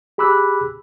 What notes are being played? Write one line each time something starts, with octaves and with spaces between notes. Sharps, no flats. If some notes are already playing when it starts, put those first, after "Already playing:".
G4 G#4 B5 D6 E6 F#6